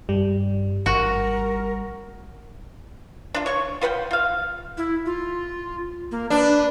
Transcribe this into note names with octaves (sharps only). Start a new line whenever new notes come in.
G2 G3
G#1 F#4 A#4
D4 F4
C#5 C#6
F4 B4 F#5 G5
F4 F5
E4
F4
A#3
D4 B4